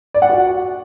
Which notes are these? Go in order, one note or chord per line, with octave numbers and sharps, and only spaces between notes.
D5
F#5
F#4